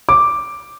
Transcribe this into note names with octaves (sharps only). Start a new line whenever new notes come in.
D6